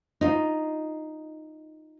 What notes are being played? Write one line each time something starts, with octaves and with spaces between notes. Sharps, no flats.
D#4 F4